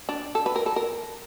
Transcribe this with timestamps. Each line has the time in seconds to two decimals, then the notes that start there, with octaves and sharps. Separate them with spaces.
0.09 D4
0.35 A4
0.46 B4
0.56 A#4
0.66 A4
0.76 A#4